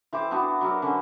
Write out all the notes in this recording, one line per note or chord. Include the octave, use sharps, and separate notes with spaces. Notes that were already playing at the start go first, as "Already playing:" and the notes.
E3 C5 G5 D6
B3 D4 F#4
F#3 D4 A#4
D3 C#4 B4 C5